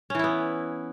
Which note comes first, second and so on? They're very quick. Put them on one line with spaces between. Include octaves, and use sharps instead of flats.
C#4 E3 E4 B3